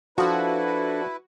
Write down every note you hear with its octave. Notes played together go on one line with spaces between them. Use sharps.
F3 D4 E4 F#4 A4 B4